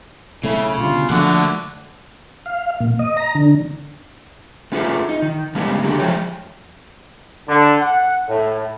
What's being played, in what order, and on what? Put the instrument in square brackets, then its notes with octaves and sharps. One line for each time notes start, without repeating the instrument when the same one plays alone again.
[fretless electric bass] B1 A3 C#4 [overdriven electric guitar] C#3 [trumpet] E4
[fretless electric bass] B2 D3 G3 [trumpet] F4
[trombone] D3 [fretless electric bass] F3 A#3 D4 [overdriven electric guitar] A3 F#5 [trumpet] F#4
[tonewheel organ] F5
A#2
D#5
A#5
D3
[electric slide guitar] A3 C#4 F4 F#4 G#4 B4
D#4
D#3
C#3 G3 G#3 A#3 B3 C#4
D3 A#3 C4 F#4 G4
F3 G#3 A3 G4 C#5
[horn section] D3
F#5
A2